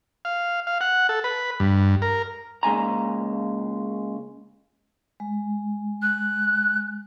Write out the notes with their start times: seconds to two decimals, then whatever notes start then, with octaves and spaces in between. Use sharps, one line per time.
0.25 F5
0.67 F5
0.81 F#5
1.09 A4
1.24 B4
1.60 G2
2.02 A#4
2.63 C#3 G#3 A#3 G#5 A#5
5.20 G#3
6.02 F#6